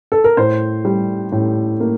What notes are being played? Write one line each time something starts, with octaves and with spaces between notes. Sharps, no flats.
A4
A#4
A2 C5
G3
A2
A#3